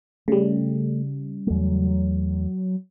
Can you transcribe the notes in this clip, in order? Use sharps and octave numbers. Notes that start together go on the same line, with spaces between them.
C#3 G3 A3
E2 F#3 A3